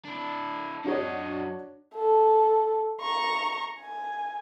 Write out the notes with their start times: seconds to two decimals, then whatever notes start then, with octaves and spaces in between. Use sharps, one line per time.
0.05 D4 E4
0.84 F#2 D4 F#4 C#5 D#5
1.95 A4
3.01 A#5 C#6
3.80 G#5